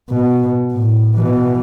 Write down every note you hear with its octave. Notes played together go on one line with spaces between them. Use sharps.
B2
A2
B2 E3